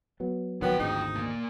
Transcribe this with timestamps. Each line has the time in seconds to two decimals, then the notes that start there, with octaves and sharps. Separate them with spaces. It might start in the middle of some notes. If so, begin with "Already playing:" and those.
0.20 F#3 B3
0.62 A#1 D#3 F#3 B3 F4 G5
0.79 G#1 D2 G#2 D#4
1.15 A#2 A#3